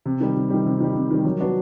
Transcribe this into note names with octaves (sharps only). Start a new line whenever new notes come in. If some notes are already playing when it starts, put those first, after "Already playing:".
C3
D#3 G3
C3
D#3 G3
C3
D#3 G3
C3
D#3 G3
F#3
B3 D4 F#4